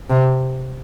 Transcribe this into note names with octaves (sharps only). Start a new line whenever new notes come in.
C3